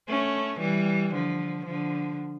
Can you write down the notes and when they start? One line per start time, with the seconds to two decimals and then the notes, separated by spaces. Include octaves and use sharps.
0.08 A3 C#4
0.61 E3 G3
1.14 D3 F3
1.66 D3 F3